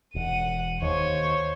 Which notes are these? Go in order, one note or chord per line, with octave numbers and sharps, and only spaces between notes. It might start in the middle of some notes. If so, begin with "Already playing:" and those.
E1 F#5 D#7
D#2 C5 C#5